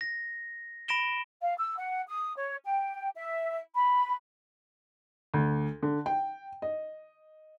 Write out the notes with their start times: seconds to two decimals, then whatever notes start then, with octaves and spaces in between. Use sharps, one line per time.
0.01 A#6
0.88 B5 A#6 D7 E7 G7
1.42 F5
1.57 E6
1.78 F#5
2.08 D#6
2.36 C#5
2.65 G5
3.15 E5
3.75 B5
5.34 D2
5.83 D3
6.06 G5
6.62 D#5